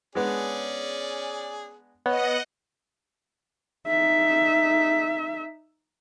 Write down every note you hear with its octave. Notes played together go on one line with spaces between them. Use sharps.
G#3 B3 C#4 D4 G#4 D5
B3 C#5 D#5 F#5
D#4 E5